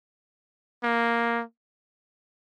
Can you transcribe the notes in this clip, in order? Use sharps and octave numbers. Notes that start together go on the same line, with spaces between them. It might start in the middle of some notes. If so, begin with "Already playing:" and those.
A#3